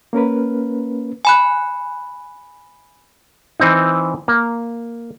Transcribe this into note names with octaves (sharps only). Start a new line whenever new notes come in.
A#3 C#4 A#4 B4
G#5 B5 F#6
E3 C4 D#4
A#3